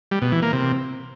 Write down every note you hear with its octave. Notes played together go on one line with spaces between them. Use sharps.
G3
B2
E3
A#3
C3